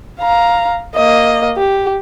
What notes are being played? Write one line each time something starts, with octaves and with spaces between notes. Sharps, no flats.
F5 A#5
A#3 D#5
G4